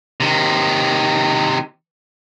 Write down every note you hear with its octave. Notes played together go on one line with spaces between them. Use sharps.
C3 D#3